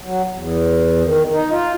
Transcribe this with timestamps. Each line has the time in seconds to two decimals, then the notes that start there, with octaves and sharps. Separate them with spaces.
0.01 F#3
0.35 E2
1.04 D#3
1.32 D#4
1.51 F4